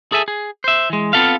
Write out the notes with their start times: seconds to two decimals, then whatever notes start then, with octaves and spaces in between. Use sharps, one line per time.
0.12 G#4 A4 E5 G#5
0.28 G#4
0.64 C5 E5
0.90 E3 G#3
1.13 B3 C4 F4 A4 E5 F5